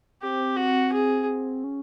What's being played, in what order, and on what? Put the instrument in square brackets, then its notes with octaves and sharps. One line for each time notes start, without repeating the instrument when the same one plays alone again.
[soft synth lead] C4 [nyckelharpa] G4
[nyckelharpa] F#4
G#4
[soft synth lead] C#4